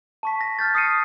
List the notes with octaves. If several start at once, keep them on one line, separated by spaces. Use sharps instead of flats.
A5 C#6 B6
A#6
F6 G6 A6
D#6 F6 C7 C#7 D#7